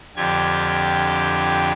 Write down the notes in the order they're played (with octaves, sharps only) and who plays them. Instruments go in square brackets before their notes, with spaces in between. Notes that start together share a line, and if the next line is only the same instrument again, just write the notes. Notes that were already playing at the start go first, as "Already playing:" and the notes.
[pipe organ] F2 D3 F4 G4 G#6